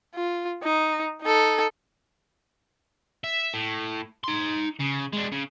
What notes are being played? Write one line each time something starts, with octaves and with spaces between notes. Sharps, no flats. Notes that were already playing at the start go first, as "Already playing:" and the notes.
F4
D#4
D#4 A4
E5
A2
D#4 C6
C#3
G#3 D4
C#3